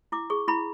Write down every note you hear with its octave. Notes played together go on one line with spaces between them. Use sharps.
E4 D6
G#4 C#6
E4 B5